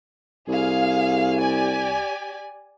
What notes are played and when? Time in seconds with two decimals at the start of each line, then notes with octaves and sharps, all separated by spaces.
0.49 C2 G#4 F5
1.38 G4 D5 G#5